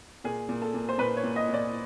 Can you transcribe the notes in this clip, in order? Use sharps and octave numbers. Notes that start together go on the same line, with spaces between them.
A#2 G#4
A#2
A4
A#2
C5
A#2 B4
C#5
A#2
D#5
A#2 D5